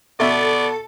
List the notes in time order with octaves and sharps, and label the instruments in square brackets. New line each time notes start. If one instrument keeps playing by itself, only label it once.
[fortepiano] B2 E5 C#6 [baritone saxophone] B3 [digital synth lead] A4 [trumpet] D5